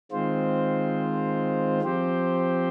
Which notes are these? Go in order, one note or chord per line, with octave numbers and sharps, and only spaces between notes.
D#3 G#3 C4 F4 C5
F3 C4 G4 C5